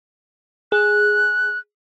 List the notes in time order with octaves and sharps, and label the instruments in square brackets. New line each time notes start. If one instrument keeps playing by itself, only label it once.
[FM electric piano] G#4 [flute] F#6